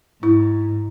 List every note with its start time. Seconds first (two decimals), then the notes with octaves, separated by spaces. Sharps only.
0.23 G#2 E4